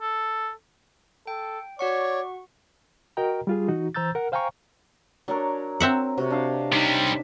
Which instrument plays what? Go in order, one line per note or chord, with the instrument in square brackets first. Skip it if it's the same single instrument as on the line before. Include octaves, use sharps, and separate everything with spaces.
[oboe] A4
[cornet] A4 [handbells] G5
[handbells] F#4 F#5 C#6 [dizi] C#5 [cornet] D5
[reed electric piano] F#4 A#4 D#5 G5 A#5
G3 F4 G#4
E3 D#4 F#4
E3 C5 A#5 E6 G6 A6
A#4 F#5
C5 F5 G5 G#5 A#5 C#6
[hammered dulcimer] F#3 A#4 [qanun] D4 C#5
[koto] C4 E5 F#5
[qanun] C3 [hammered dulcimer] F#4
[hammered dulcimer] D4 F5
[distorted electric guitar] C3 G3 [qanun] D#4